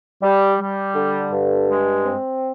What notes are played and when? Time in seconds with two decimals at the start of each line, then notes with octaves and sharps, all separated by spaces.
0.22 G3
0.58 G3
0.95 D3
1.31 G2
1.68 G#3
2.04 C4